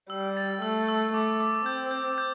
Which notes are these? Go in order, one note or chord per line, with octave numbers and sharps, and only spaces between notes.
G3 E6
A6
A3 E6
E6
A3 D6
D6
C4 G6
G6
G6